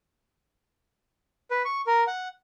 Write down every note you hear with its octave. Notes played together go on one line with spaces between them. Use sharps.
B4
C#6
A#4
F#5